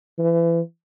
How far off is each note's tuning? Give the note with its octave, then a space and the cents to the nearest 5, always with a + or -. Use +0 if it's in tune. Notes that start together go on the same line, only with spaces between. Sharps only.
E3 +30